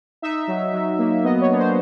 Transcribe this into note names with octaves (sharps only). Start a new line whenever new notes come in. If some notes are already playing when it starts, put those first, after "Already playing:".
D#4 E5
F#3
F#3
A#3
B3 D#5
C#5
D4
C5